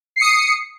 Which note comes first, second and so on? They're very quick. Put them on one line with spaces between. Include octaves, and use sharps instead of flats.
C7 C#7 D#6